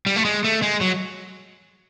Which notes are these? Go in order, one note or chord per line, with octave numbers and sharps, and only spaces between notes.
G3
A3
G#3
A3
G#3
F#3